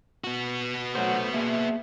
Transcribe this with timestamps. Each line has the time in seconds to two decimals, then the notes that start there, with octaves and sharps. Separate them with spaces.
0.24 B3 F#4
0.95 F#3 A3 C5
1.34 A#3 G#4 E5